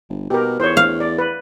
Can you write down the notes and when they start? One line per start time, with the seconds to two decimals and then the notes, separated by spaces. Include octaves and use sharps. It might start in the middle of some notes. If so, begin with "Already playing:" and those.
0.10 G1
0.30 B2 G4 A#4
0.60 E2 C5 C#5
0.77 F5
1.00 D5
1.18 B4